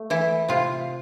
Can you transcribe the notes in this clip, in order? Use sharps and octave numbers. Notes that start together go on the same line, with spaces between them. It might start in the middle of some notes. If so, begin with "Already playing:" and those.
Already playing: A3
E3 E4
C3 F4